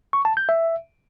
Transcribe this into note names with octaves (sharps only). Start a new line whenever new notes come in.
C#6
A5
G6
E5